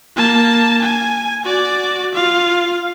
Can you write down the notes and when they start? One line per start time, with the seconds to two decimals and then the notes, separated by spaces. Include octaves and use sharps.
0.16 A#3 A5
0.82 G#5
1.44 F#4 D5
2.14 F4 F5